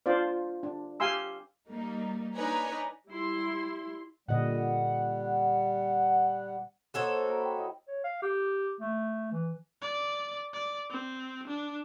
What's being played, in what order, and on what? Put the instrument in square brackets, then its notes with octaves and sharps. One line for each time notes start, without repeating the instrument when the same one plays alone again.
[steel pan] D4 F4 C5 D5
D4
G4 F5 G#5 C6 E6
[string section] G3 A#3 D#4
D4 D#4 B4 C#5 G#5 A#5
[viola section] G3 E4 C6
[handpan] A#2 D3 D#5 [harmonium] G3 [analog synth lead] F#5
[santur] A#3 C5 D#5 [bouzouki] F#4 A4 C#5
[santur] A#3 A#4
G5 B5
E4 D#5 F#5
[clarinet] C#5
F5
G4
A3
E3
[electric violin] D5
D5
C4
D4